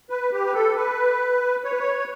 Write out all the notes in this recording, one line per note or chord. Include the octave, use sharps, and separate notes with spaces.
B4
G4
B4
A4
B4
C#5
B4
C#5